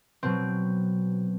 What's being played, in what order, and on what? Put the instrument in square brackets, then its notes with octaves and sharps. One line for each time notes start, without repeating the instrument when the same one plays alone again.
[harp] B2 F#3 C4